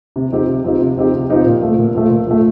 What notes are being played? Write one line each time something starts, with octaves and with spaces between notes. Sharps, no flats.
C3
F3 C4 D#4 G4
C3
F3 C4 D#4 G4
C3
F3 C4 D#4 G4
C3
F3 C4 D#4 G4
A#2
F3 A3
A#2
F3 A3
A#2
F3 A3